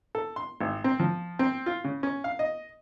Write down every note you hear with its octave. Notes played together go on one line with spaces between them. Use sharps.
A4
C6
G#1
C4
F3
C4
F4
C#3
C#4
F5
D#5